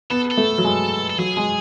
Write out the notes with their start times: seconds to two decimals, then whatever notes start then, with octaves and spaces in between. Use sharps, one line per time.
0.10 B3 A4
0.31 A4
0.37 A3
0.58 F#3
0.64 G#3
1.10 A4
1.18 F#3 G#4
1.37 G#3